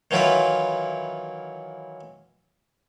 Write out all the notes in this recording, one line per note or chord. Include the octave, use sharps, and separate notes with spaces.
D#3 E3 F#3 E4 F4 B4